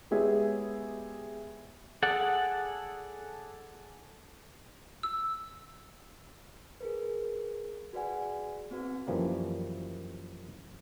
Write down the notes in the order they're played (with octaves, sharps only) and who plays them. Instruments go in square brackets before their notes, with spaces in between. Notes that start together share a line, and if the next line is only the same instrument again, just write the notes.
[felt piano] G#3 B3 G4 G#4 C#5 E5
[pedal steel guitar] G#4 A4 D5 F#5
[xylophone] E6
[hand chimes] G#4 A#4 B4
F#4 G#4 B4 D5 F#5 G#5
B3 C4 F#4 B4
[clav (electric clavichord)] F#2 E3 F3 G3 A#3